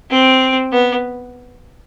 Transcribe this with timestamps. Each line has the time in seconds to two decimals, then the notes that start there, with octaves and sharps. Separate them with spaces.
0.11 C4
0.72 B3